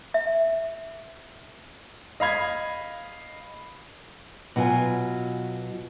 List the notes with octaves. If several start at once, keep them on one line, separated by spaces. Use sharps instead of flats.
E5
D#5 F5 B5 G#6
B2 F#3 F4 G5 G#5